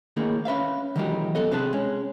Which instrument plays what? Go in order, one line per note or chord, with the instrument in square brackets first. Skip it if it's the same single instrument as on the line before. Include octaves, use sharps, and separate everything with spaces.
[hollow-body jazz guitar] A2 D#3 A#3 D#4 G#4
C#4 B4 E5 F5
D#3 E3 F#3 G#3 D#4 G4
F#2 B3 A4 D#5
C3 C4 G#4 B4 A5
G#3 C#4